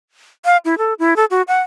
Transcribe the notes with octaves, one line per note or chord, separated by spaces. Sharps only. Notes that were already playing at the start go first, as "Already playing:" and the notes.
F5
E4
A4
E4
A4
F#4
F#5